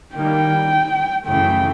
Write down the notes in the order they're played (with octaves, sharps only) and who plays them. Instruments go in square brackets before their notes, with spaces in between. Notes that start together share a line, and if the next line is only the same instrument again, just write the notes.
[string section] D#3 G3 A#3 [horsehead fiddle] G5
[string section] F#2 C#3 E3 A3 [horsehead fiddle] G5